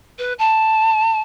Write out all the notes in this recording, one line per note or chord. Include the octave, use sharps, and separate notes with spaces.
B4
A5